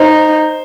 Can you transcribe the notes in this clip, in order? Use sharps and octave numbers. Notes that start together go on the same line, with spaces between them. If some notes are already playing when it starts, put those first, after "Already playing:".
Already playing: D#4 C5